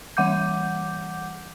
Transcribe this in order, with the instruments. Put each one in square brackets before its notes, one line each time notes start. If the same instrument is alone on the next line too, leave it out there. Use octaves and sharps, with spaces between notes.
[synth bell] E3 G3 F#5 D6 G6